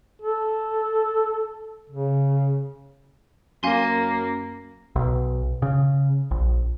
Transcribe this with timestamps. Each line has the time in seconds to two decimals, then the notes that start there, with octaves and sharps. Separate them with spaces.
0.22 A4
1.89 C#3
3.63 F#2 A#3 F5 G#5 C6
4.96 B1
5.62 C#3
6.31 A#1